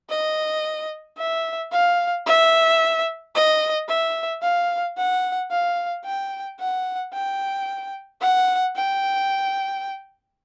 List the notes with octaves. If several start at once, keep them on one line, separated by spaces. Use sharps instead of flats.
D#5
E5
F5
E5
D#5
E5
F5
F#5
F5
G5
F#5
G5
F#5
G5